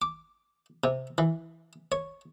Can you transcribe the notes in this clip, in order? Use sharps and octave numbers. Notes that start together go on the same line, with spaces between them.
D6
C3
E3
C#5